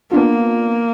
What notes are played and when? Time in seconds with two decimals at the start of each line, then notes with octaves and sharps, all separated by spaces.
0.11 A#3 B3 D4 F4